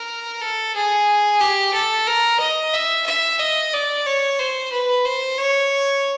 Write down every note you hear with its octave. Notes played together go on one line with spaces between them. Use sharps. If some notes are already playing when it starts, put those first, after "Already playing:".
Already playing: A#4
A4
G#4
G4
A4
A#4
D#5
E5
E5
D#5
D5
C#5
C5
B4
C5
C#5